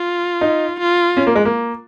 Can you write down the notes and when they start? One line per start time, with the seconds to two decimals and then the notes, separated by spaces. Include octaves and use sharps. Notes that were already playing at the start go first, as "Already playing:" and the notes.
Already playing: F4
0.41 D#4
0.80 F4
1.17 C#4
1.27 A#3
1.35 G#3
1.45 A#3